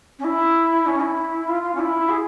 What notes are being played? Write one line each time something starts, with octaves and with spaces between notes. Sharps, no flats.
C#4
E4
C#4
E4
F4
F4
C#4
E4
G#4